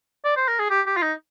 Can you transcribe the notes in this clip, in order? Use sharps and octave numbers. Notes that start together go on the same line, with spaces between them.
D5
C5
A#4
G#4
G4
G4
F4
D#4